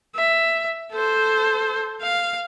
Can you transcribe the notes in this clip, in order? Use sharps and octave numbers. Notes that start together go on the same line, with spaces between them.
E5
A4 C5
F5